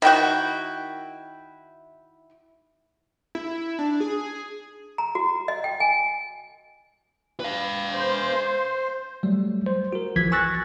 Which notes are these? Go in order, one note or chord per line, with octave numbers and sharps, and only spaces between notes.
D#3 E4 F#4 G5
E4
D4
G#4
A#5
F#4
D#5
G5
G#5
B4 F5
C5
F#3 G3 A3
C5
F#4 A#4
A#1 E3 F3 G#6 B6
G#5 C#6 E6 F#6 A6 A#6